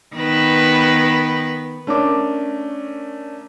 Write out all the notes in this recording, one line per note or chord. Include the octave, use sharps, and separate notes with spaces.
D#3 B3 B4
A3 C#4 D4 A#4 D6